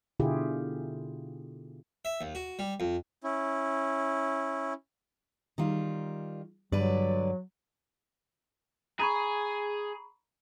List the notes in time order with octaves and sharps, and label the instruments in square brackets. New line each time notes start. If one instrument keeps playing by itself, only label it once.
[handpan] B2 D3 E4 F4 G4 G#4
[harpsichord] E5
D#2
F#4
G3
F2
[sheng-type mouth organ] C#4 E4
[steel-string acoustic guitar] D#3 G3 F4
[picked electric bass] G2 [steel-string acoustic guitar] D3 B4 D5 [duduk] F#3
[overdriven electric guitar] G#4 [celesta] A#5 B5 C#6